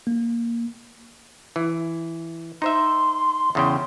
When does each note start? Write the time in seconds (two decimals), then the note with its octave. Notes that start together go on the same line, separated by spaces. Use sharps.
0.07 A#3
1.56 E3
2.62 D#4 C5 E5 C6
3.55 E2 C#3 G5